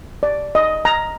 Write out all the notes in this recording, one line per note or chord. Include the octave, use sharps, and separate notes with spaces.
D5
D#5
A#5